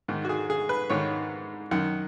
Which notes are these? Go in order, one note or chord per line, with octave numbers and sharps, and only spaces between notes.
G#2 D#3
F#4
G#4
G#4
B4
G#2 D#3 C#5
F#2 D#3 F#5